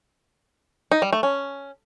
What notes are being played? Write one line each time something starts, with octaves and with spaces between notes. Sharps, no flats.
D#4
G3
A3
C#4